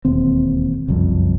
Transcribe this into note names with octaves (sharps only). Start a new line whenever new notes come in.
E1 D#2 C4
F#1 C2 F2